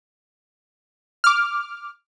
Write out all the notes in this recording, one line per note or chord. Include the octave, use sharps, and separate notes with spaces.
D6 F6